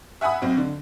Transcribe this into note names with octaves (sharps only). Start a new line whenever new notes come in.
E5 F#5 G#5 B5 D#6
B1 C4
D3